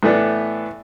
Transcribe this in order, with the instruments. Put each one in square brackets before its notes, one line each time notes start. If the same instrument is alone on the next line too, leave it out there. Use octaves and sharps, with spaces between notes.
[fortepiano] A2 E3 A3 B3 D4